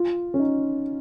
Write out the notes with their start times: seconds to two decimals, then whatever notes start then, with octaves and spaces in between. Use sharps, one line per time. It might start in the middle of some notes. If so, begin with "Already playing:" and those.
Already playing: F4
0.34 C#4
0.39 D#4